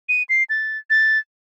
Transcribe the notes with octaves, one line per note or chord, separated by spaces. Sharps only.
D#7
C7
A6
A6